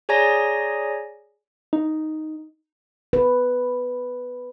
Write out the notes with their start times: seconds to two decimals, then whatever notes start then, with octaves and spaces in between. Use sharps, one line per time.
0.09 G#4 C#5 D5 G#5 A#5 A#6
1.73 D#4
3.13 B4